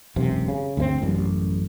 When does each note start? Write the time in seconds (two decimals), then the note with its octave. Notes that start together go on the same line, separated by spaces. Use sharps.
0.16 E1 B1 F#2 C3
0.48 C#3
0.77 D2 G2 G#3 C4
1.02 A1 F#2 G3